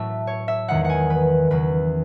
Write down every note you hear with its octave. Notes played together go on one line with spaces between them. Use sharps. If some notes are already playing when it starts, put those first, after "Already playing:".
Already playing: A2 F#3 A3 E5
C#5
E5
E2 D#3 G#3 F#5
F#5
G#5
B4
E2 C#3 F#3 B4